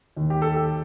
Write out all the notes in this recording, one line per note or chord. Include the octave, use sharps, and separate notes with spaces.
D#2 D#3
G4
A4
G4